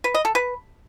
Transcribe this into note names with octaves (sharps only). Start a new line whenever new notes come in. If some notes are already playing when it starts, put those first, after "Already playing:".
B4
D#5
A4
B4